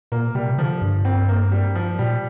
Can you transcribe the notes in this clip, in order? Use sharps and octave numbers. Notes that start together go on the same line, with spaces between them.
A#2 A#3
C3 G3
D3 F3
G2
C4
A#3
G3
F3
A#2 G3